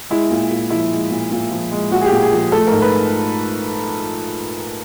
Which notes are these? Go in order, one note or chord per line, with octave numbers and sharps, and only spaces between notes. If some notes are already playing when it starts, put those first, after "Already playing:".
G#3 E4
A#2
A#2
F3 E4
G#3
A#2
A#2
F3
G#3
A#2 F#4
G#4
G4
A#2
G#4
F3
G#4
A3 A4
G#2 A#4
B4